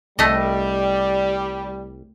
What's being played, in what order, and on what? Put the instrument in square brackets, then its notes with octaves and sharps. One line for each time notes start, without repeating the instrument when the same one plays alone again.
[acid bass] C2 [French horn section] G3 [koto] A3 D#5